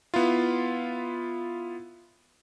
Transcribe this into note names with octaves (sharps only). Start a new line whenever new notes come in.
B3 E4 F4